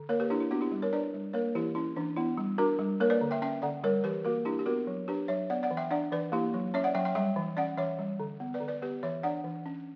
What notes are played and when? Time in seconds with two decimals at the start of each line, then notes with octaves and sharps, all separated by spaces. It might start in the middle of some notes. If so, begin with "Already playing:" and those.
Already playing: D3
0.09 A#3 A#4 C#5
0.20 G4 B4
0.30 D4 E4 G4
0.40 E4
0.51 B3 D4 F#4
0.61 E4 G4
0.72 G3
0.82 A#4 C#5
0.93 D4 B4 D5
1.14 G3
1.33 A#3 A#4 C#5
1.55 E3 E4 G4
1.75 C#4 E4
1.96 E3 D4
2.17 B3 E4
2.37 G3
2.58 D4 F#4 A#4
2.79 G3
3.00 A#3 A#4 C#5
3.10 B4 D5
3.21 D3
3.31 E5 G5
3.42 C#4 E5 G5
3.62 D3 D5 F#5
3.84 G3 A#4 C#5
4.04 E3 G4 B4
4.25 A#3 F#4 A#4
4.45 D4 E4 G4
4.59 G4
4.66 B3 F#4 A#4
4.87 F#3
5.08 D4 G4 B4
5.28 F#3 C#5 E5
5.50 B3 D5 F#5
5.63 D5 F#5
5.71 E3
5.77 E5 G5
5.90 D4 D5 F#5
6.12 E3 B4 D5
6.32 A#3 E4 G4
6.54 F#3
6.74 C#4 C#5 E5
6.84 D5 F#5
6.95 F#3 E5 G5
7.05 E5 G5
7.15 G3 E5 G5
7.36 E3
7.57 C#4 D5 F#5
7.77 E3 C#5 E5
7.99 G3
8.20 D3
8.40 B3
8.54 B4 D5
8.61 D3
8.68 B4 D5
8.82 B3 G4 B4
9.03 E3 C#5 E5
9.23 D4 D5 F#5
9.44 E3
9.66 C#4